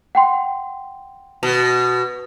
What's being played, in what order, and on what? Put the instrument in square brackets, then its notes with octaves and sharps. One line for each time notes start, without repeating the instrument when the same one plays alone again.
[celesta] F#5 G5 C6
[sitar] B2